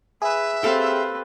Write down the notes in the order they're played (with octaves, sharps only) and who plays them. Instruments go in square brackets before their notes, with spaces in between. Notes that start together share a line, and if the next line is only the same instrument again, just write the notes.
[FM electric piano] G#4 [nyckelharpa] B4 [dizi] E5
[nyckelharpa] C4 B4 [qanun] G4 A4 F5